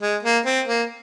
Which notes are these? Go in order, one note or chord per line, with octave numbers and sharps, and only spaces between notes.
G#3
A#3
C4
A#3